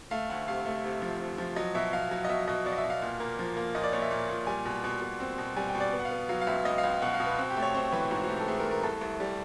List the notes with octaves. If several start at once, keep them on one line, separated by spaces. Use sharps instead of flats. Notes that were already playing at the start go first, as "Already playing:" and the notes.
A3 F5
D2 F#5
C3 F5
A3
C3
F3
C3
F3
F#3 D#5
B2 E5
B2 F5
F#3
D#5
B2 E5
B2 D#5
B2 D5
D#5
E5
B2
F5
A#2
A#3
F3
A#3
A#2 D#5
D5
A#2 C#5
E5
A#2
A#2
G3 G#5
B2
B2
B2
C4
B2
G3 G#5
G5
B2
D5
B3
F#5
F5
B3
F#3 F5
F5
C#2 E5
C#2 D#5
F5
C#2
B2 F#5
F5
B2
B4
C4
G4
A3
C#5
C4 C5
E3 B4
G#2 F#4
F#4
A3 G4
A4
A3 G#4
A#4
A3
A#4
C2 A4
C2
G3